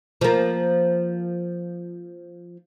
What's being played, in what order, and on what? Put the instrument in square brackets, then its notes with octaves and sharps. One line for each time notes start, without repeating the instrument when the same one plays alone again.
[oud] F3 A#3